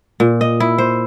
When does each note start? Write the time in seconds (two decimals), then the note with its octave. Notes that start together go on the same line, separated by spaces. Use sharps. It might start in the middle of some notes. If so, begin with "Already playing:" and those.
0.20 A#2
0.41 D#5
0.60 E4
0.78 C5